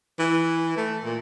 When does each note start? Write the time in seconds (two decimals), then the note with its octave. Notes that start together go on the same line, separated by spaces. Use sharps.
0.19 E3
0.77 A3
1.03 A#2